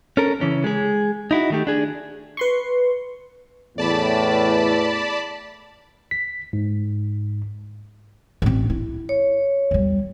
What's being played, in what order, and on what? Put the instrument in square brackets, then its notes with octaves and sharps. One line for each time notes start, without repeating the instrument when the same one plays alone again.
[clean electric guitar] C#4 A4 A#4
C#3 E3 C#4
G#3 G#4
D#4 E4 F#4
D#3 A3 G4
D4 G#4
[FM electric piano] B4 C6 C#6
[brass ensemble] E2 A2 [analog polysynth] D5 A5 B5
[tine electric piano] B6
G#2
[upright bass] A1 C4
E4
[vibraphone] C#5
[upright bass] E2 G3